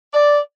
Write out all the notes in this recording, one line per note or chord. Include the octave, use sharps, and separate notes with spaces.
D5